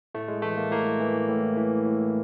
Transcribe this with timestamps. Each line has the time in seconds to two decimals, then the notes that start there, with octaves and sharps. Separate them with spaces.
0.15 A2 A3
0.28 G#3
0.42 E3 A3
0.57 A#3
0.71 A2 A#3
1.00 E3
1.29 A2
1.57 E3
1.86 A2